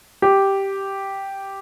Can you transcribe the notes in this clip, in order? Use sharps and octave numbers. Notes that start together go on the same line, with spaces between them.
G4